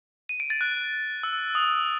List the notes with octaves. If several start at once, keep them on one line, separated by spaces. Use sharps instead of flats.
D#7
D7
A6
F#6
E6
D#6